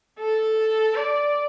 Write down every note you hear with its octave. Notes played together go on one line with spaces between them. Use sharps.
A4
D5